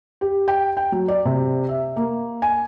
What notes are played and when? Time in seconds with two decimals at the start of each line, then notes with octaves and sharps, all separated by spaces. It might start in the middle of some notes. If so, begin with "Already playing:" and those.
0.21 G4
0.48 G5
0.77 G5
0.92 F#3
1.08 D5
1.25 C3
1.69 E5
1.96 A#3
2.42 G#5